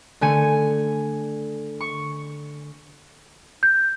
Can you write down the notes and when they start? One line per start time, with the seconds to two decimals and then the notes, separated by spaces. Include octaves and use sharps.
0.21 D3 A3 G#5 D#7
1.81 C#6
3.63 G6